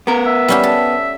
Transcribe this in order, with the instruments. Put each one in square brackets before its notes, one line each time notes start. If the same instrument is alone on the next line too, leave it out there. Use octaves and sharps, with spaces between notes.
[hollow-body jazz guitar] B3 A#4
[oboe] E5
[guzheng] G3 C#4 G4
A4